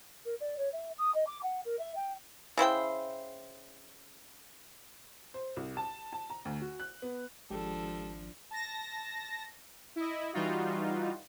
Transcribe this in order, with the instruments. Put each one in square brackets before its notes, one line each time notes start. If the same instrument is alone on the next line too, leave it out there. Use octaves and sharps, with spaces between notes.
[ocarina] A#4
D5
C#5
E5
D#6
D#5
D6
F#5
A#4
E5
G5
[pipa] C#3 E4 C5 G5
[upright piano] C5
C2
A5
A5
A#5
D2
F#4
F#6
B3
[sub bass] G#1 [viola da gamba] F3 D4 [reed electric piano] G#3 G4 [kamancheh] A4
[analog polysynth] A5 A#6
E4 D#5
E3 G3 D#4 F4 F#4